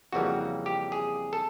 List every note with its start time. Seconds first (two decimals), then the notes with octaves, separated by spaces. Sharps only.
0.13 F2 C#3 E3 G3 A#3 F#4
0.66 G4
0.92 G#4
1.33 A4